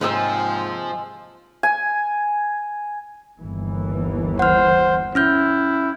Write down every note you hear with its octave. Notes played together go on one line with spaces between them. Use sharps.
D#2 G#2 C3 F3 G#3 C4 E6
G#5
G1 D#2 E3
C5 F#5 F6
C#4 E4 F6 G6